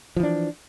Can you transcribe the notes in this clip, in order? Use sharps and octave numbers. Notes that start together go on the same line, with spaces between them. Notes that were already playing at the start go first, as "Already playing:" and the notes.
E3 F3 D4